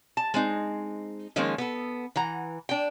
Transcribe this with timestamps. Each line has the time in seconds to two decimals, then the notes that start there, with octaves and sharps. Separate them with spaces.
0.17 A5
0.34 G#3 C4 D#4
1.36 D#3 F3 G#3 A#3 C#4
1.58 B3 A4
2.16 E3 F#5 A#5
2.69 D4 G5